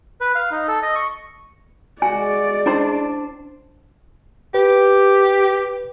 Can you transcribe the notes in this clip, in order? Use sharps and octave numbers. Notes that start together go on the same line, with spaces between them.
B4
F5
D#4
A4
D#5
C#6
G#3 F#4 D5 G#5
C#4 D4 E4 C5 C6
G4 B4